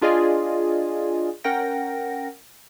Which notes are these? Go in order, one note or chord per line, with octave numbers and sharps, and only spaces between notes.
D4 F4 G#4 D5 D#5 G#5
C#4 A#4 F#5 G5 A#6